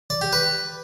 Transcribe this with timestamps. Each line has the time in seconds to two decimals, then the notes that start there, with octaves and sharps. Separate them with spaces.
0.10 D5
0.21 G4
0.33 B4